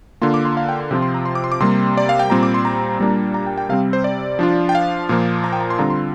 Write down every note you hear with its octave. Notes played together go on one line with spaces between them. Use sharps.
D3 A#3 F4 C6
D6
C6
F5
G5
C6
C3 F3 C4 F4
C6
A#5
C6
D6
C6
D6
C3 G3 A#3 C6
D5
F5
G5
A#2 G3 C4 A#5
D6
C6
A#5
A#2 G3 A#3 D4
A#5
G5
G5
C3 G3 C4 F5
C5
D5
F3 D4 F4
G5
F5
A#2 F3 A#3
A#5
G5
A#5
C6
D3 G3 C4 F4 A#5
C6